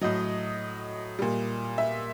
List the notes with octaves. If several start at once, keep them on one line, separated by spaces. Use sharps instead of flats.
A2 F#3 D#5
A#2 G3
E5